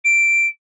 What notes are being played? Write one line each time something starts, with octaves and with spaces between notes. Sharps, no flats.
D7